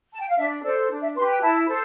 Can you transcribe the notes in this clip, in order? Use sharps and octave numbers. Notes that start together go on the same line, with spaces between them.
A5
G5
F5
D4 E5
A4 C5 D5
D4
E5
G4 B4 C6
G5
E4 A5
A4 C5